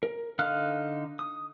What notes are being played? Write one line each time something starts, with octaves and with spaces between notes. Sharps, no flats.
A#4
D3 D#4 F5 F6 F#6
D#6